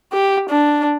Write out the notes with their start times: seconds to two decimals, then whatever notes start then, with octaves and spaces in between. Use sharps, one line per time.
0.13 G4
0.49 D4